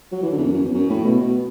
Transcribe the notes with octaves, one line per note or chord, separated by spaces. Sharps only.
F#3
E3
D3
E2
F#2
F#2
E2
F#2
A2
B2
B2